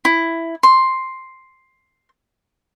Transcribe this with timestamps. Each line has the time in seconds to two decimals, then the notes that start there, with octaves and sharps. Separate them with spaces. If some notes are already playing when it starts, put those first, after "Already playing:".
0.05 E4
0.63 C6